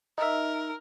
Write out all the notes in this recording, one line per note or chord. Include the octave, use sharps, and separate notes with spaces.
D#4 A#4 E5